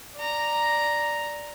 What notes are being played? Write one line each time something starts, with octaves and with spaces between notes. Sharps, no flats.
D5 A#5